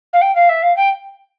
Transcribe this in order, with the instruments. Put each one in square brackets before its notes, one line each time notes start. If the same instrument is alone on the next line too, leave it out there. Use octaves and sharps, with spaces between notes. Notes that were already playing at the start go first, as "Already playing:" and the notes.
[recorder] F5
G5
F5
E5
F5
G5